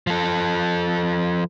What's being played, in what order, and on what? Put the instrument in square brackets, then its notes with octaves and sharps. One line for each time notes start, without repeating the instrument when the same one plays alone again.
[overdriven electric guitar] F3 A4